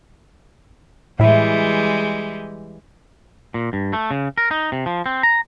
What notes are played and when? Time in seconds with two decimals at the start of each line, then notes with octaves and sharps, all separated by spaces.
1.19 A2 E3 G3 G#3 E4
3.54 A#2
3.73 G2
3.93 A3
4.11 C#3
4.38 A#4
4.51 D#4
4.72 C3
4.86 F3
5.06 C4
5.23 A#5